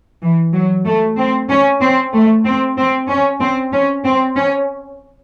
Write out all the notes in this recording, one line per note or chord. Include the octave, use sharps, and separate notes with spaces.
E3
F#3
A3
C4
C#4
C4
A3
C4
C4
C#4
C4
C#4
C4
C#4